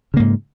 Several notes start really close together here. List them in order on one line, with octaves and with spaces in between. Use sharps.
C#3 A#3 G#2